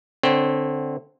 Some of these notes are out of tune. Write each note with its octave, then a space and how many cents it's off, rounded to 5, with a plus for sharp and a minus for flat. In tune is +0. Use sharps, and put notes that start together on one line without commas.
D3 +0 C4 +0 C#5 -15